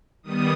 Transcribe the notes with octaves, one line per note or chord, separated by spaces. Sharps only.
D#3 G3 B3 D#6